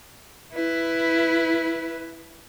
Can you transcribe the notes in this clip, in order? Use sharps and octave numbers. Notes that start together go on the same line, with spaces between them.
E4 B4